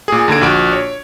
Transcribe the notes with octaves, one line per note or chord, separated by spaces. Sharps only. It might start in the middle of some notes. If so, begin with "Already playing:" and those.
A#2 G#4
D#2 D3 G#6 D7
A#1 F#4 D7
C#5